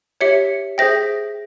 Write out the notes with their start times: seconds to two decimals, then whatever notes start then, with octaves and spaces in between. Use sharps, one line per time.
0.21 G4 C#5 E5 C#7
0.78 G#4 C5 E5 G5 A#6